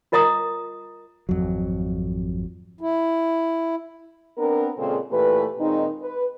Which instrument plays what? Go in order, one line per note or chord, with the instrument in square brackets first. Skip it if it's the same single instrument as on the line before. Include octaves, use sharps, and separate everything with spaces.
[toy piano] F4 A#4 D#5 A#5 D#6
[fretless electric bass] G#1 F2 F#3
[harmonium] E4
[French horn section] B3 C4 D4 A#4
A#2 C#3 G#3 C4 G#4 A4
A#2 E3 A3 G4 B4
A#2 D#3 G#3 C4 D#4
B4